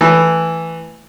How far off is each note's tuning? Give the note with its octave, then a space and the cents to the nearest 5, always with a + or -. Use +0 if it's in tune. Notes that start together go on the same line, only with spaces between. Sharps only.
E3 +0 A3 +0